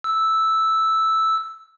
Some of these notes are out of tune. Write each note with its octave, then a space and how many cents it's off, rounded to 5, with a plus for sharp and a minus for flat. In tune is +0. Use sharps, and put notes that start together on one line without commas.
E6 -5